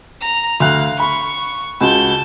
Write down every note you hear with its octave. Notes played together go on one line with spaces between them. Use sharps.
A#5
D2 F5 F#6
B5 C#6
C#2 F#4 A5 G6